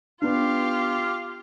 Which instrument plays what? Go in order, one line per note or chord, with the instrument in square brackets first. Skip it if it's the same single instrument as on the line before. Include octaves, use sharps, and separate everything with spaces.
[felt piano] B3 D4 [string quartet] F4 G4 [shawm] F5